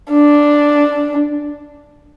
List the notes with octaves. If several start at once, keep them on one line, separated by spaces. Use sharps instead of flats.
D4